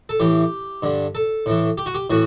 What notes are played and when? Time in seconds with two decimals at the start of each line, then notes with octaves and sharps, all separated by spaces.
0.09 A4
0.20 A2 E3 G4
0.83 G2 D3
1.15 A4
1.46 A2 E3
1.78 G4
1.86 F#4
1.95 G4
2.10 A2 E3 F#4